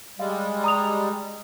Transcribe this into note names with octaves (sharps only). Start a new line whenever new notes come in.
G3 G#3 F5
A#5 D#6 F7